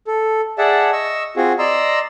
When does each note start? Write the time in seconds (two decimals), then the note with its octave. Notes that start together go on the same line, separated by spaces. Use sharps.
0.07 A4
0.58 G#4 D5 E5 F#5 A5
0.93 D#5 C#6 E6
1.37 C4 F4 F#4 G#4
1.59 D5 D#5 A#5 C6 E6